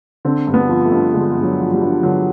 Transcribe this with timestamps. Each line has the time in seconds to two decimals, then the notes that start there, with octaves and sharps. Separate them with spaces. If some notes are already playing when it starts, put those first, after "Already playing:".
0.25 D3 C4
0.47 G2
0.54 B3
0.69 F3
0.84 A3
0.92 G2
1.14 D3 G#3
1.36 G2
1.43 F#3
1.59 F3
1.73 G3
1.82 G2
2.03 D3 F#3